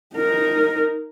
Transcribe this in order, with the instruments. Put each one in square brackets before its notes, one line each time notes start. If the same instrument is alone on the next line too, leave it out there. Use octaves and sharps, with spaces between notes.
[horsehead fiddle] D#4 A#4